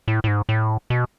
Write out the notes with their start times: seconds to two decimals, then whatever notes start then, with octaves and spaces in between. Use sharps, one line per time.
0.08 A2
0.24 A2
0.28 G#2
0.49 A2
0.90 B2